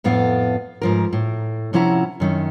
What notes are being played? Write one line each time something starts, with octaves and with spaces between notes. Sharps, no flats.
F2 A2 B3 F5
G#2 F3 A#4
A2
C3 F3 C#4 E4 F#5 A#5
F#2 D#3 C#4